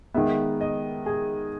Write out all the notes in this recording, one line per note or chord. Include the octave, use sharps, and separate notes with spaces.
D#3 G#3 B3 E5
D#5
G#4